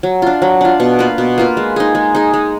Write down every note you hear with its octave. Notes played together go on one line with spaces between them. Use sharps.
F#3
D4 F4
F#3
D4 F4
B2
A#3 F4 B4
B2
A#3 F4 B4
G#3
D#4 G#4
G#3
D#4 G#4
G#3